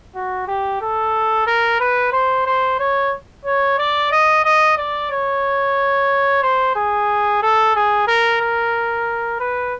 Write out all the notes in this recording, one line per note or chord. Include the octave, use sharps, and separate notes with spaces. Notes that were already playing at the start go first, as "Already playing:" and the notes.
F#4
G4
A4
A#4
B4
C5
C5
C#5
C#5
D5
D#5
D#5
D5
C#5
C5
G#4
A4
G#4
A#4
A#4
B4